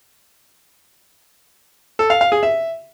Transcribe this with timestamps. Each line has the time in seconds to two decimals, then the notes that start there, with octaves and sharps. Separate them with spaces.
1.99 A4
2.10 F5
2.21 F5
2.32 G#4
2.43 E5